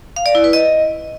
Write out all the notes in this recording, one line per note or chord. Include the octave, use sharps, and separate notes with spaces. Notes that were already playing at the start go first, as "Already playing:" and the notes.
F5
D5
E4
B4
D#5